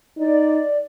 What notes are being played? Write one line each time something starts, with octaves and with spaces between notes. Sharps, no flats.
D#4 D5